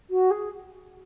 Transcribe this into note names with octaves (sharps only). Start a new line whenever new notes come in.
F#4
G#4